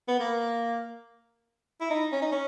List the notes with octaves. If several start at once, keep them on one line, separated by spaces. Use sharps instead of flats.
B3
A#3
E4
D#4
C#4
D#4
C#4